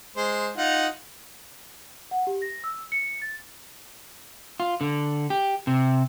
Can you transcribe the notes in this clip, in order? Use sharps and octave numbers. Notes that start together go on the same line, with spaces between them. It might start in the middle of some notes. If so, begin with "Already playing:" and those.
G#3 C5
D#4 F4 F#5
F#5
G4
A#6
E6
C#7
A6
F4
D3
G4
C3